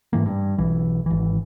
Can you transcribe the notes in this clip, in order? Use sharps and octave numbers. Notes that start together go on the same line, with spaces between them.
G#2 E3 A#3
G2
B1 E3
G#1 E3